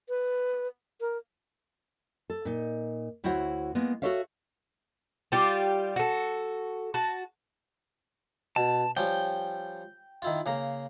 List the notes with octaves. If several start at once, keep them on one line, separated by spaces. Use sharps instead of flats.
B4
A#4
A4
A#2 D#4
D2 E4 F#4 C5 C#5 F#5
G#3 A#3 B3
F#4 G4 A4 C#5 E5 F5
G3 F4 G4
F#4 A4
F#4 A5
B2 A5
F3 G3 C#4 G5
D#3 E4 F4
C#3 A#3 A#4